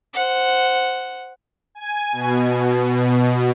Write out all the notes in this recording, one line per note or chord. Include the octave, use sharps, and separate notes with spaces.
C5 F#5
G#5
B2